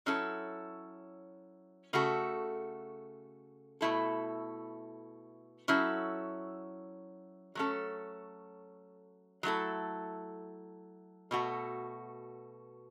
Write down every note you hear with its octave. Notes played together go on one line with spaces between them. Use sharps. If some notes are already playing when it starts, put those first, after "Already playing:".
F#3 C#4 E4 A4
C#3 A3 F#4 A4
B2 A3 E4 A4
F#3 C#4 E4 A4
F#3 A3 C#4 A4
F#3 A3 E4 A4
B2 A3 F#4 A4